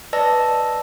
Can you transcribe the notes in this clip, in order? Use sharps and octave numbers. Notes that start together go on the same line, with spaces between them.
B4 D5 D#5 A5 E6 A#6